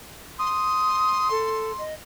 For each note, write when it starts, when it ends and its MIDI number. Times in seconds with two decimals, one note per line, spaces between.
0.39 1.83 84
0.39 1.28 87
1.30 1.71 69
1.78 1.93 75